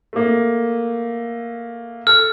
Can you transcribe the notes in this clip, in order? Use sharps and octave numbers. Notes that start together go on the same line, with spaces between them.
A3 A#3
A4 F6